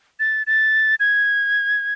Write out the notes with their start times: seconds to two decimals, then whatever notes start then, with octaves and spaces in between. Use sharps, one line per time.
0.20 A6
0.47 A6
1.00 G#6